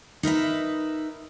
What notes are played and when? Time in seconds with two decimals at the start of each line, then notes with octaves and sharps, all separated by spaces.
0.23 D#4 A#4 B4 E5